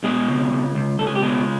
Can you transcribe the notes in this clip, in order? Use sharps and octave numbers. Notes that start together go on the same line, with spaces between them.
B2 G#3 G#4
C#2
C#2
C#2
C#2 A4
G#4
G4
B2 G#3 G#4